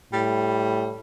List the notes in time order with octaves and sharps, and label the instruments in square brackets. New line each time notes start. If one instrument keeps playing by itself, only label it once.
[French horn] A2 [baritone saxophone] G3